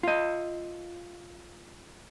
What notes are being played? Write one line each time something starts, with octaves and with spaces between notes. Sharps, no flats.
F4 D#5